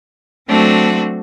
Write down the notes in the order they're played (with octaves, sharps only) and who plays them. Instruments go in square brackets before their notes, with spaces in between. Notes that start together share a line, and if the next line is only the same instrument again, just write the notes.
[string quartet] F#3 A3 C4 D4 F#4